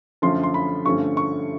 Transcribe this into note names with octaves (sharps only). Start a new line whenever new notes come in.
F#2 D3 F3 A3 C#4 C6
C6
B5
G2 D3 F3 A3 C#4 C#6
C#6